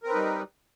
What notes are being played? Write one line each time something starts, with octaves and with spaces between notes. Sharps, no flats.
G3 C4 D#4 A#4 B4